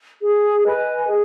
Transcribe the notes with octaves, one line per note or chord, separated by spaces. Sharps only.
G#4
B4 D#5 G#5
G#4